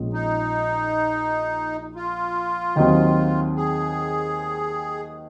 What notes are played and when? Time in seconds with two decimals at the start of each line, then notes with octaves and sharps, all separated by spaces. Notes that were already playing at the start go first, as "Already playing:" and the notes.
Already playing: A#1 A#2 G#3 C#4
0.13 D#4
1.96 F4
2.76 D#2 D#3 F#3 C4
3.56 G#4